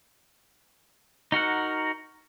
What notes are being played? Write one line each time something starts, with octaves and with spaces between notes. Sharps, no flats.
D#4 F#4 A#4 F#5